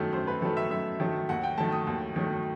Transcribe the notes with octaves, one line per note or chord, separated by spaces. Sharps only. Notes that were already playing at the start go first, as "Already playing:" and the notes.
Already playing: F#2 D#3 F#3 A3
F#2 C5
B4
D#3 F#3 A3 A4
E5
F#2 E5
D#3 F#3 A3
D#2 F#5
G5
D#3 F#3 A3 A5
D#6
D#2
D#3 F#3 A3